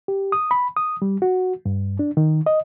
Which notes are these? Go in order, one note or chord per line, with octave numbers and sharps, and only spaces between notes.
G4
D#6
B5
D#6
G3
F#4
G2
D4
D#3
D#5